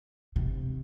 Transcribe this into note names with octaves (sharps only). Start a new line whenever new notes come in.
C3